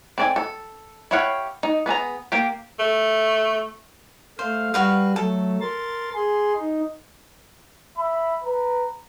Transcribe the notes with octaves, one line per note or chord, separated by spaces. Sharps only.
C4 A4 D5 D#5 G#5
A4
E4 G4 C#5 F5 F#5
D#4
B3 G#4 A5 A#5
A#3 G4
A3
A3 C5 F5
G3 F#4 B4 F5
F#3 A3 A4
A#4 C6 A6
G#4 C6
D#4
E5 B5
B4 A#5